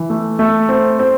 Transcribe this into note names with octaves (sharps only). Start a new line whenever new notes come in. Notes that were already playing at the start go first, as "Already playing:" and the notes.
Already playing: E3
A3
A3
C4
C4